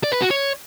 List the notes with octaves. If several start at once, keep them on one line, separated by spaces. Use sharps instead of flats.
D5
B4
F#4
C#5